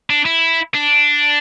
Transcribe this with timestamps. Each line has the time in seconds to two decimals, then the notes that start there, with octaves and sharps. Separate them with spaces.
0.10 D4
0.25 E4
0.75 D4